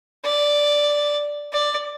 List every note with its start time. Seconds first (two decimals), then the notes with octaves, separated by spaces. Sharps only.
0.25 D5
1.53 D5